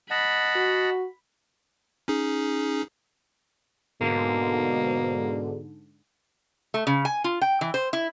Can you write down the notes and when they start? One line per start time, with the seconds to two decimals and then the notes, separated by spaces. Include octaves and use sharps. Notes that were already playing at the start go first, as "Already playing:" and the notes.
0.10 D#5 F#5 A5 B5
0.56 F#4
2.08 C#4 D#4 G#4
4.01 G#2 B2 D3 A#3
6.74 A3
6.87 C#3
7.05 G#5
7.24 F4
7.41 G5
7.61 E3
7.74 C5
7.93 E4